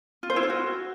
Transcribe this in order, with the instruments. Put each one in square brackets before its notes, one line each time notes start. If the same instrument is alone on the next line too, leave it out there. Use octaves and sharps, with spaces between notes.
[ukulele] F4
C5
E4
F4
F#4